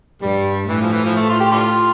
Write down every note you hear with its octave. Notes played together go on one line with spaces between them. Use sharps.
G2 G3
A2 E3
F3
E3
F3
A3
F4
G4
D4 F4